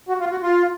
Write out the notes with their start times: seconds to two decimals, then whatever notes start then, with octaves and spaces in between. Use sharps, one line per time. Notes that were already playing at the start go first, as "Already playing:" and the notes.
0.08 F#4
0.20 F4
0.31 F#4
0.42 F4